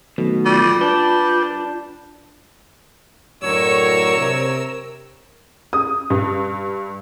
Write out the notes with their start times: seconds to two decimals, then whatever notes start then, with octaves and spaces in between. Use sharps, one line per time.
0.18 B2 D#3 F#3 A3
0.45 G3 F4
0.81 G3 D4 B4 A5 G6
3.43 F#2 A2 D3 F#3 A#4 C#5 E6
4.17 C3
5.73 D#6
6.10 G2